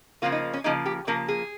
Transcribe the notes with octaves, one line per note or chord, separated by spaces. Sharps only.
C#3 F3 A#3 F4
D#4
C#4
C#3 F3 A#3 D#4
G4
C#3 F3 A#3 A#4
G#4